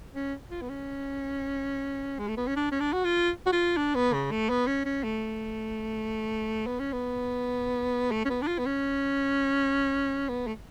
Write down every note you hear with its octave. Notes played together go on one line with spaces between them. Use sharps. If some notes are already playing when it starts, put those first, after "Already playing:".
C#4
F4
B3
C#4
G#3
A3
B3
C#4
D4
C#4
D4
F#4
F4
F#4
F4
D4
B3
C#3
A3
B3
C#4
C#4
A3
B3
C#4
B3
A3
C#4
B3
D4
F4
B3
C#4
B3
A3